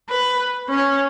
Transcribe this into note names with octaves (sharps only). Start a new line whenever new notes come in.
B4
C#4